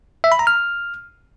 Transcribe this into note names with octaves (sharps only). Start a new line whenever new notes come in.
E5
B5
A#5
F6